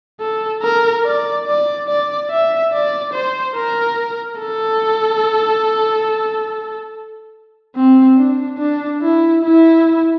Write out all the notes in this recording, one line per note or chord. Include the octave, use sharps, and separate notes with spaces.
A4
A#4
D5
D5
D5
E5
D5
C5
A#4
A4
C4
D4
D4
E4
E4